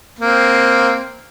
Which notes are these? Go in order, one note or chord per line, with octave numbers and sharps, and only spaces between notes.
A#3 C4